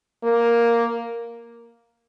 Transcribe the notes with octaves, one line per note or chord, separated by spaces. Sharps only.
A#3